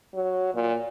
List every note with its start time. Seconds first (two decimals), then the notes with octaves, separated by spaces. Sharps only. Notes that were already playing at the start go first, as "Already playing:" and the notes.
0.15 F#3
0.54 A#2